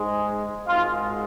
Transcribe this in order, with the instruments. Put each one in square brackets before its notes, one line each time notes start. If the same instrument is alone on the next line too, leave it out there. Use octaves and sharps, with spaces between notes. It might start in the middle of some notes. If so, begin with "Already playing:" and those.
Already playing: [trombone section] G#2 G#3
G#1 G#2 G#3 F4